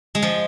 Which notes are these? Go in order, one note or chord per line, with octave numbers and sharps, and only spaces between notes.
G#3
F3